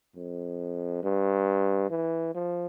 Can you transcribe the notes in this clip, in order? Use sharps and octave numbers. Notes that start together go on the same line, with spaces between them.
F2
G2
E3
F3